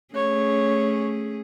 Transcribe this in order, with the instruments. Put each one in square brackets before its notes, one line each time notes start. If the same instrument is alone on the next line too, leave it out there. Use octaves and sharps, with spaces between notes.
[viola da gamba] A3 C#4 G#4 [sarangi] C#5